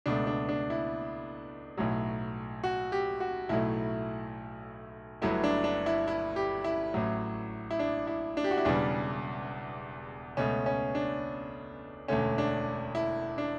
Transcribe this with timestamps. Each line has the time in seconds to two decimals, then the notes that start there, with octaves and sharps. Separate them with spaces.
0.06 C#2 B2 A3 D4
0.27 D4
0.49 D4
0.70 E4
1.77 B1 A2 F#3
2.64 F#4
2.92 G4
3.20 F#4
3.49 B1 A2 F#3 A3 E4
5.22 G1 G2 F#3 A3 E4
5.44 D4
5.64 D4
5.86 E4
6.08 E4
6.36 G4
6.64 E4
6.94 A1 A2 F#3
7.71 E4
7.79 D4
8.07 E4
8.37 D4
8.44 G4
8.51 F#4
8.58 E4
8.65 E1 E2 C#3 G3 D4
10.37 C#2 B2 A3 C#4
10.66 C#4
10.95 D4
12.08 E1 D2 D3 A3 C#4
12.38 D4
12.95 E4
13.38 D4